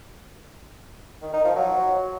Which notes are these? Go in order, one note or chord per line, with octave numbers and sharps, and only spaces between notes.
D#3
D#4
F3
F#3